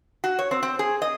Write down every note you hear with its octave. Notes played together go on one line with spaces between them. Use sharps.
F#4
C#5
C4
C4
G#4
D#5